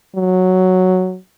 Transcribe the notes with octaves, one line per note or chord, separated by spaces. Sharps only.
F#3